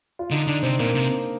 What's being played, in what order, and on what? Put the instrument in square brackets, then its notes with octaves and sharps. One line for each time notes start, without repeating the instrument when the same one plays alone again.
[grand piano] F4
[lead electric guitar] D3 [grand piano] D#4
[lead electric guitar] D3 [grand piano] D4
[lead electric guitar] C3 [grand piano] C4
[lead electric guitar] A#2 [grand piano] A#3
[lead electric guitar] C3